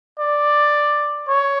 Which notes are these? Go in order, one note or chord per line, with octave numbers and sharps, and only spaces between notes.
D5
C#5